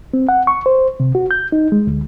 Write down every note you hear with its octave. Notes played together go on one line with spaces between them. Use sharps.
C4
F#5
C#6
C5
C3
F#4
G6
D#4
G#3
D2